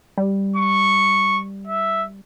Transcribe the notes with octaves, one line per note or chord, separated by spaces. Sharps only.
G3
C#6
E5